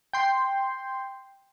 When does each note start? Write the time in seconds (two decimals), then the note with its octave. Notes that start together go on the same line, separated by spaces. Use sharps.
0.13 G5 C6